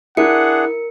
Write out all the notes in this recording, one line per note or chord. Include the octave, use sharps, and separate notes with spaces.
D4 E4 G#4 A#4 F#5 C#7